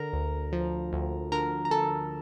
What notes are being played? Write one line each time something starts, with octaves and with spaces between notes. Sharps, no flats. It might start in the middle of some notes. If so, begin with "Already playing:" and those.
Already playing: D3 A#4 A#5
D2
F3
D2
D3 A#4 A#5
A#5
D2 A4 A5